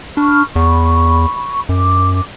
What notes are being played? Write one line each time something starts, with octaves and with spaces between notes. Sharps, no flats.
D4 B5 C#6 F6
E2 B5 C#6
F#2 D6